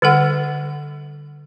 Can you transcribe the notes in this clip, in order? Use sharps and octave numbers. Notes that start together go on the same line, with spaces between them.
D3 G3 A4 F#5